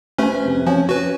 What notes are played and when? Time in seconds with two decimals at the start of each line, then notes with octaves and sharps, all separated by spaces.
0.18 A3 C#4 B4 C5 G#5
0.45 F2 C3
0.67 F3 C#4 C#5 G#5
0.89 F#4 B4